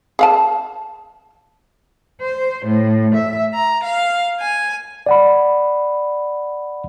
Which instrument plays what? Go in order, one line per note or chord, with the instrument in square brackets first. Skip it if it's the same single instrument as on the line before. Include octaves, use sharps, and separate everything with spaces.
[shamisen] G#4 F5 A5
[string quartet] C5
A2
E5
A#5
F5
G#5
[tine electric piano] D5 F#5 B5